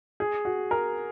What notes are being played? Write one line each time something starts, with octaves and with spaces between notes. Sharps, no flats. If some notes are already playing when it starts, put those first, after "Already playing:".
G#4
F#4
A#4